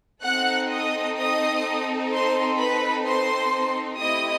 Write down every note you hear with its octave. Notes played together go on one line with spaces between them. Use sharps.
C4 D#4 A4 F#5 F#6
D#5 D#6
D#5 D#6
C5 C6
B4 B5
C5 C6
A3 C4 E4 G4 D#5 D#6